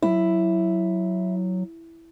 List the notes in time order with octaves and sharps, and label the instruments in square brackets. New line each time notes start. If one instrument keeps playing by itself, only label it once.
[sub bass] F#3 [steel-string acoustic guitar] E4